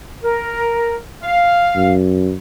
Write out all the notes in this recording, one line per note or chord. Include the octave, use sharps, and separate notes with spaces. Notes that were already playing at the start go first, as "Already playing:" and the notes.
A#4
F5
F#2